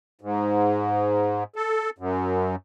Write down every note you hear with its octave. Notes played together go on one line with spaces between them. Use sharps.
G#2
A4
F#2